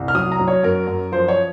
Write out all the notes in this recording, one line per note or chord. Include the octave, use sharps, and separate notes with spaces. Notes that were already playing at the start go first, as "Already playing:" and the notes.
Already playing: C2
F6
F#3 D#6
A#5
F#3
C#5
F#2 A#4
F#2
F3 C5
C#5